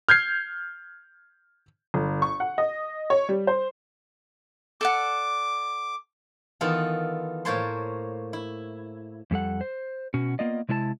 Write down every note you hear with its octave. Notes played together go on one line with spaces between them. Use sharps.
F6 G6 G#6 C7
G1
C#6
F#5
D#5
C#5
G3
C5
A4 D5 F#5 D6
D#3 E3 B3 F4 A4
A2 A#3 C5 C#5 A5 C6
E4
F2 G3 A4 F#5
C5
B2 C#4 F#4
A#3 B3 F4 D5 D#5
C3 G#3 E4 B4 A5